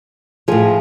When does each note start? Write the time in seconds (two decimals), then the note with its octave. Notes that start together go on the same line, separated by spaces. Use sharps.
0.48 A2 F3 G#4